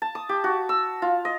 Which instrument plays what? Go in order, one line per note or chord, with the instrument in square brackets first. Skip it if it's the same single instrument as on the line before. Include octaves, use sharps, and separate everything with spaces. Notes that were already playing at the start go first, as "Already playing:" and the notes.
[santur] A5
D#6
G4
F#4
E6
F4
D#5